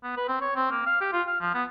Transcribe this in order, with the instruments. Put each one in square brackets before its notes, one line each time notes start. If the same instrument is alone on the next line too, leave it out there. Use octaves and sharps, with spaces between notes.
[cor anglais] B3
B4
C4
C#5
C4
A#3
F5
G4
F4
F5
F3
B3